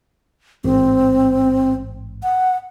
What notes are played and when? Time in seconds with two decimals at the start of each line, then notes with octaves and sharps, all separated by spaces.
0.64 A1 G#2 C4
2.23 F#5